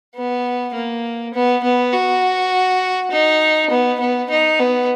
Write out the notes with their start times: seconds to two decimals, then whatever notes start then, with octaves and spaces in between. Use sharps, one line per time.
0.15 B3
0.74 A#3
1.34 B3
1.63 B3
1.93 F#4
3.11 D#4
3.70 B3
4.00 B3
4.30 D#4
4.59 B3